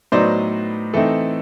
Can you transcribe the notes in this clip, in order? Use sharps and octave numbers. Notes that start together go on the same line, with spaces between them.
A2 F#3 B3 D#4 C5 D5
E3 A3 C4 D#4 A4